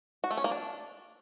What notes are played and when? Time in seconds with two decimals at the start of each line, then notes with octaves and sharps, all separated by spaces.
0.24 F#4
0.31 A3
0.37 C#4
0.44 A#3
0.51 D4